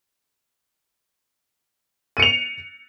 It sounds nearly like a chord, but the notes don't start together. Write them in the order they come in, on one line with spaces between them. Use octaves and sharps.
D#7 C#7 F7